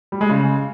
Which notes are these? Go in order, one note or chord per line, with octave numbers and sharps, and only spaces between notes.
G3
G#3
C#3